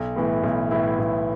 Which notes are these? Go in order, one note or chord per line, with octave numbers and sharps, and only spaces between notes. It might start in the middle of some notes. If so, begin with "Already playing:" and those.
Already playing: B1
A2 E3 B3 E4
B1
A2 E3 B3 E4
B1